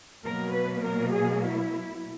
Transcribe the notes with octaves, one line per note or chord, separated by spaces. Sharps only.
B2 F#3 A#3 A#4
B4
A#4
G#4
E4